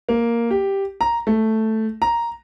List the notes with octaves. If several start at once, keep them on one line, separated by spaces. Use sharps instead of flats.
A#3
G4
A#5
A3
A#5